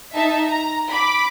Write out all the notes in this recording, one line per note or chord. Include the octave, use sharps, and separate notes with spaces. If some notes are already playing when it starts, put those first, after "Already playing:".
D#4 E5 A5
A#5
B5 D6